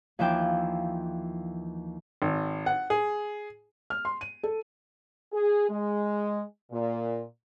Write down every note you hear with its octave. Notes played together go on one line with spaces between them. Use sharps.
D#2 E3 F3 E5 G5 D6
G#1
F#5
G#4
F6
C6
D#7
A4
G#4
G#3
A#2